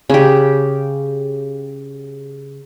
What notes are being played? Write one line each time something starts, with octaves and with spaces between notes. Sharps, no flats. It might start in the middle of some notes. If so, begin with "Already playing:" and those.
C#3 G4